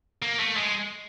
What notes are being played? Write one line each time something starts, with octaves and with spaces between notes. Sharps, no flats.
A#3
A3
G#3